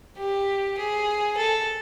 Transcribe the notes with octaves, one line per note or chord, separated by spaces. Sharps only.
G4
G#4
A4